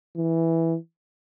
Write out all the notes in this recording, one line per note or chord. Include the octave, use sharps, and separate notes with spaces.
E3